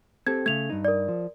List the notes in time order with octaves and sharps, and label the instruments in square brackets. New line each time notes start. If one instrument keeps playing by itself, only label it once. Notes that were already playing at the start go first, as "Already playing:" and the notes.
[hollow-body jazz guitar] C4 G4 A4 [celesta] G#6
[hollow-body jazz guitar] C#3 A3 [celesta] G#6 F7
[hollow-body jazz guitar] G2 D#4
[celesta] A#4 D5
[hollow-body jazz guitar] F3